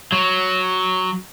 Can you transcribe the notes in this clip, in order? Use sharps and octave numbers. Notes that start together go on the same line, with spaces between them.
F#3